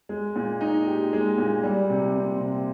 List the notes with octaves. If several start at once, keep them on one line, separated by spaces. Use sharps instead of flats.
G#3
A#2
D#4
G4
G#3
A#2
G3
C3
C4
C3